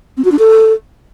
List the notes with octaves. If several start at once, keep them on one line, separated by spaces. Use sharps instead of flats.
C4
F#4
D4
A4